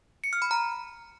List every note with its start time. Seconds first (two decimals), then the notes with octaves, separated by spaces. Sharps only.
0.24 C#7
0.33 F6
0.42 B5
0.51 A#5